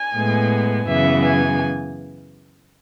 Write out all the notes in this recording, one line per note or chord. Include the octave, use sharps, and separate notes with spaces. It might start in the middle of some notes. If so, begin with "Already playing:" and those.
Already playing: G#5
A2 G#3 B3
F#2 C#3 E3 B3 E5
G#5